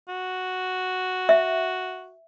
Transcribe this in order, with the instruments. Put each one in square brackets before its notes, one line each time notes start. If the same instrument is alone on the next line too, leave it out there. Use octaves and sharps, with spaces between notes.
[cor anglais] F#4
[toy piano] E5